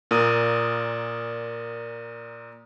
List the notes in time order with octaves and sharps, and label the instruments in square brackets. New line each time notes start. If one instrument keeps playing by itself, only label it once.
[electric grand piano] A#2 A#4 D#6